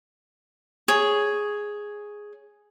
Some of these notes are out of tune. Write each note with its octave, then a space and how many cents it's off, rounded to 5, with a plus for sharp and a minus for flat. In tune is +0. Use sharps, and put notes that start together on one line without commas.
G#4 +0 C#5 +0